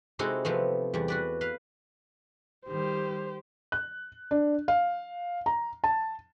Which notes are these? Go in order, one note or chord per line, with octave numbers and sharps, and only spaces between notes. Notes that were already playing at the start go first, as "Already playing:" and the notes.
C3 G#3 D#4 E4 F#4 A4
C3 F3 A3 B3
E2 G3
F#4 B4 D5
B4 F5
D#3 G3 G4 C5
F#6
D4
F5
A#5
A5